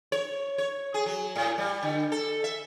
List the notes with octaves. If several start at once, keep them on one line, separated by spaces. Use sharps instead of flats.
C#5
C#5
G#4
F#3
A2
G3
D3
A4
E5